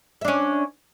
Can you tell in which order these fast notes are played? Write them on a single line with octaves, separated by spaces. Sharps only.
E5 D4 C#4